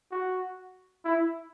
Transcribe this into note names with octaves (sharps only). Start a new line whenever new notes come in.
F#4
E4